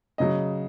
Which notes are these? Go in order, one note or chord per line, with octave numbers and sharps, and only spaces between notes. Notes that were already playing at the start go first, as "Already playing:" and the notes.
C#3 F#3 D#5